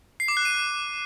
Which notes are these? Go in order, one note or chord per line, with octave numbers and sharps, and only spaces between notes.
C7
D6
F#6
D#7